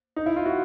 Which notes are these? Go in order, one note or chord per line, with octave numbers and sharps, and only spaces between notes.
D#4
E4
F4
F#4